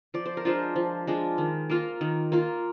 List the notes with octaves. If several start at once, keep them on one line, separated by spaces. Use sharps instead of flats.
F3 D5
C5
A#4
G#3 D4 F4 C5
F3
G#3 D4 F4
D#3
A#3 F4
D#3
A#3 F4